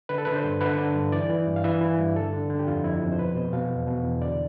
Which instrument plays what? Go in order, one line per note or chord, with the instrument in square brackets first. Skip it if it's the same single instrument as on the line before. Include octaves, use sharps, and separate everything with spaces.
[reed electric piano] D3 B4
A4
D3 B4
C5
G2
D3 B4
D3
G2
E3 D5
E3
G2
F5
E3 E5
E3
G2
D3 A4
D3
D3
G4
F2 F4
F2 E4
F2
C5
B2 B4
B2 C5
B2 F5
E2
B2
E2
D3 D5